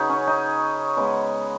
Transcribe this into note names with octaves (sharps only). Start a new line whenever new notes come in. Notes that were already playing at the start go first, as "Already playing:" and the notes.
Already playing: C#3 F#3 D#4 G#4 B4 C#5 F#5
C#4
D#4
C#3 G#3 B3